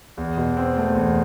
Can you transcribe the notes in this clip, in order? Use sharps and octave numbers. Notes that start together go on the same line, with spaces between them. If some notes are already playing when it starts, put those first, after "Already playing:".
E2
B2
C4
A3
E2